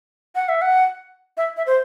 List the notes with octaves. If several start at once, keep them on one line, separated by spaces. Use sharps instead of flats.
F#5
E5
F#5
E5
E5
C5